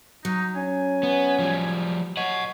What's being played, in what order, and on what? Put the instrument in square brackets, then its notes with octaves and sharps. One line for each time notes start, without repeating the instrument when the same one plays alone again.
[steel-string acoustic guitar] F#3 [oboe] D#4
[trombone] C#4 [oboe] G#5
[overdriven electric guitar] B3
F3 G3
[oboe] C#5 [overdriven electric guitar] D#5 F#5